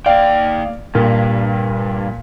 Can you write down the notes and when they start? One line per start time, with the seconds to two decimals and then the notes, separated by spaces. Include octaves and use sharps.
0.06 A#3 D5 F5 G5
0.95 G2 A#2